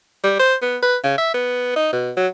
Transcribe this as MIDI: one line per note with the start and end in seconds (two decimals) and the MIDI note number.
0.24 0.36 55
0.39 0.55 72
0.62 0.77 59
0.83 0.97 71
1.04 1.18 49
1.18 1.31 76
1.34 1.72 59
1.76 1.89 63
1.93 2.11 47
2.17 2.28 54